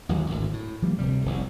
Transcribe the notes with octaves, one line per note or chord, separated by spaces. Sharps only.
A1 D#2 F#3 G#3
G#1 D2 A2
A2
F3 G3 A3 A#3
D1 D2 C3 G3
F1 C2